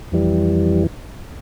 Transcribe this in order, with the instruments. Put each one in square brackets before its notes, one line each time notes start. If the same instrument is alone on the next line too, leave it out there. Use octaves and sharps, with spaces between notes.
[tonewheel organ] F2 E3 G3